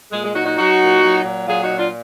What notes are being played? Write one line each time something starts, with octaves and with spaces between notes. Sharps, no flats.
A#2 G#3
G#3
F#3 D#4 F#4
D#4 F#4
F#3 D#4 F#4
A#2
F#3
A#2
F#3 F4 G#4
D#4 F#4
A#2
D4 F4